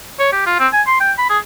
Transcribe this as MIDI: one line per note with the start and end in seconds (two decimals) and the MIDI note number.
0.19 0.28 73
0.32 0.46 67
0.46 0.58 65
0.59 0.67 60
0.73 0.82 80
0.87 0.97 84
1.00 1.12 79
1.18 1.29 83
1.30 1.38 68